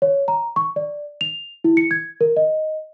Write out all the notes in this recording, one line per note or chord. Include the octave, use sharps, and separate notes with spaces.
C#5
A#5
C#6
D5
F7
E4
C#7
G#6
A#4
D#5